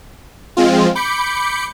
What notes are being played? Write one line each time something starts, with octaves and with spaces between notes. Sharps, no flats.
F3 G#3 C4 F4
B5 D6 G6 C#7